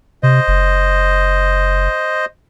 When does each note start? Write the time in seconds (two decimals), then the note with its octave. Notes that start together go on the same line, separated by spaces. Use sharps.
0.23 C3 C5 D#5
0.48 F#1